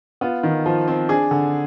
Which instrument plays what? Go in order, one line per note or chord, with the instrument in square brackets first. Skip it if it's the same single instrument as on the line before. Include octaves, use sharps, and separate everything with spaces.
[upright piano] B3 F4
D#3
F3
C4
D4 G#4
D3